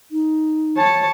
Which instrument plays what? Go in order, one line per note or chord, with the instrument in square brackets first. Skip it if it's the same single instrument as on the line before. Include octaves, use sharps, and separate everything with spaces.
[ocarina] D#4
[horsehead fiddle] C#5 A5